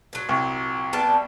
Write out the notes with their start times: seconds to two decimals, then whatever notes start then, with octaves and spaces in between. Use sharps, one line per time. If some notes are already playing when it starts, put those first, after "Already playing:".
0.13 A#2 F#3
0.29 C2
0.93 G3 B3 A5